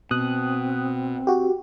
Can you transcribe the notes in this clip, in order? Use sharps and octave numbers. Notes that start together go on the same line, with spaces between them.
B2 C4 D#6 F#6
F#4 G4